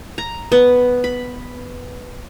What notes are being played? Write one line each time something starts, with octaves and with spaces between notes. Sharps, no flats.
A#5
B3
B5